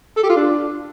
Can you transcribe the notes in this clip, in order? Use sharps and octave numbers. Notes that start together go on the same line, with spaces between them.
A4
G4
F4
D4